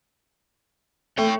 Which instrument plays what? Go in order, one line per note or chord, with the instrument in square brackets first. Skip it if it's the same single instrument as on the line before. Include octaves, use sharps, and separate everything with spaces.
[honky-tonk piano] A3 [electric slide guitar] C#5 G5